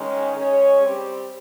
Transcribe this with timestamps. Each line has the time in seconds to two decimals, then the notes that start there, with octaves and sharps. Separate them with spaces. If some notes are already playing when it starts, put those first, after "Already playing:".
Already playing: D#3 G#3 C#4
0.34 G#3 C#4 G#4 C#5
0.80 G3 C4 G4